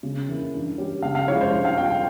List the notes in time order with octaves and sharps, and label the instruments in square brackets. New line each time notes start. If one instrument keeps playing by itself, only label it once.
[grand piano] C#3
E3 A#3 E4
G2
G3 C#4 G4
[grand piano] C#3 [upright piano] F5
[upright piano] F5
[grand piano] F3 G#3 E4 G4 [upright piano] C#5
[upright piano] C5
[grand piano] G2
[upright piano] F5
[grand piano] G3 C4 F4 [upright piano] G5
[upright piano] G5